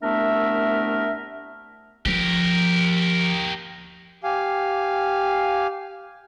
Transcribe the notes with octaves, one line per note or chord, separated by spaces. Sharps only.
C2 A3 B3 D4 A#4 E5
F3 G4 A#4
G4 F5 G#5